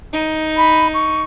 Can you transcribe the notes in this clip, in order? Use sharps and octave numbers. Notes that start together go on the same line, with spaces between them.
D#4
B5
C#6